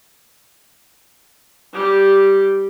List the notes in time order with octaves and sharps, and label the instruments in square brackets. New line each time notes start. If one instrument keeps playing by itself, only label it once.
[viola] G3 G4